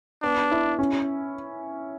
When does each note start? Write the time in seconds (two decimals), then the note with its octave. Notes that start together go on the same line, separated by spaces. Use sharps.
0.23 B3 D4
0.51 E4
0.79 C#4